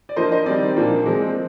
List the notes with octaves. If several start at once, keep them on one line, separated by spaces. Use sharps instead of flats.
D5
F3 A#3 D4 C5 D#5
C5 D#5
D#3 G3 C4 D5
A#2 F3 A#3 D4
F3 G#3 C4